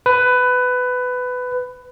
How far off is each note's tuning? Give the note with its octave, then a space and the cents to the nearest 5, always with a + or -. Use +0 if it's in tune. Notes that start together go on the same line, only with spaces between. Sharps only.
B4 +15